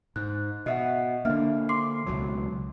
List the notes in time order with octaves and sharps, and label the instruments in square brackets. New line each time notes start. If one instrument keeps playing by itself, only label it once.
[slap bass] G#2 [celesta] F#6
[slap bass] B2 [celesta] D#5 E5 F#5
[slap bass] D3 A#3 [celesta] D4 E5 F6
[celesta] C6 D6 C7
[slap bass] C#2 B2 F#3